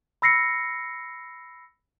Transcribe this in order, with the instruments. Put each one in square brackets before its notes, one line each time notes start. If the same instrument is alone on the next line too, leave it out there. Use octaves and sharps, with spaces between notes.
[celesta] B5 E6 A#6 C7 C#7